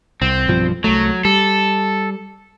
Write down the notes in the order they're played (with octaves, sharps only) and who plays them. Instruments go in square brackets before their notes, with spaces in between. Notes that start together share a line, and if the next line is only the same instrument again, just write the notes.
[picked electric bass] C2 [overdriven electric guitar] C4
[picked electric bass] B1 G2 F3
[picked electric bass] C2 A3 [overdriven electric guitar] F#3
[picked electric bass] G3 [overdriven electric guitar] A4